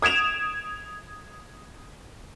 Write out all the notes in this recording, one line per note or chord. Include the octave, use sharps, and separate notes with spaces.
D#6 G#6 D7 E7 F7